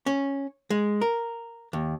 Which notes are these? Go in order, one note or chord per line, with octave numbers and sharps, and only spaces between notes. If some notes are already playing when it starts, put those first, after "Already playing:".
C#4
G#3
A#4
D#2